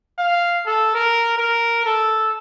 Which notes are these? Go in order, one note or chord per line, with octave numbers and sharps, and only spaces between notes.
F5
A4
A#4
A#4
A4